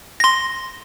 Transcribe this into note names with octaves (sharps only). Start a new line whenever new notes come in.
C6 A#6